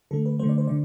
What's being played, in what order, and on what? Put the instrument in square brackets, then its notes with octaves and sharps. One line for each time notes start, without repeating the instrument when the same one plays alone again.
[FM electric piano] D3 A3 A4
B4
D3 A3 C5
D5
C5
D3 D5